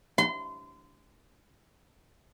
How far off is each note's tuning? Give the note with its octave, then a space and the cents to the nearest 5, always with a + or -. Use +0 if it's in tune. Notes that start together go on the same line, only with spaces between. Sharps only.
C6 -30